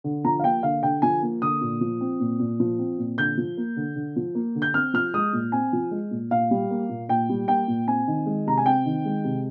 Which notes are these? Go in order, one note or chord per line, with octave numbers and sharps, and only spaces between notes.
D3
F3 A#5
F5
A#3 G5
D3 F5
D3 G5
F3 G#5
A#3
D3 D#6
A#2
F3
C4
A#2
A#2
F3
C4
A#2
D3 G6
F3
A#3
D3
D3
F3
A#3
D3
G6
C4 F6
F3 F6
G#3 D#6
A#2
C4 G#5
F3
G#3
A#2
A#2 F5
G3
A#3
A#2
A#2 G5
G3
A#3 G5
A#2
C4 G#5
D#3
G#3
C3 A#5
G#5
C4 G5
D#3
G#3
C3